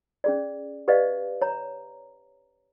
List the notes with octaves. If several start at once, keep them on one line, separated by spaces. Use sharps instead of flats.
C#4 G#4 D5
G4 B4 D5 D#5 F5
C#5 A#5